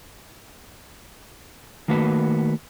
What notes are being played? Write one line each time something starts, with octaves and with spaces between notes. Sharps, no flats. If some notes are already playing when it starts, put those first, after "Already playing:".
D#3 A3 A#3 F#4 B4